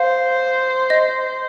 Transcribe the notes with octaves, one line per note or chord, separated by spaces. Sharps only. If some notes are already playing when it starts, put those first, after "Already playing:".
Already playing: C5 F5
D#5